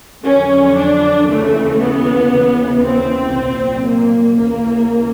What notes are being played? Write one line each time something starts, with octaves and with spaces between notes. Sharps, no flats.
F2 D3 F#3 C#4
D4
D#2 C#3 E3 A3
B3
D#2 C#3 E3
C4
C2 A#2 F#3
A#3
D#2 C#3 E3 A#3